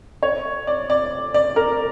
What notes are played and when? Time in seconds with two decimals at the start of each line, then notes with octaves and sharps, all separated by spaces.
0.23 C#5
0.67 D5
0.90 D5
1.34 D5
1.56 A#4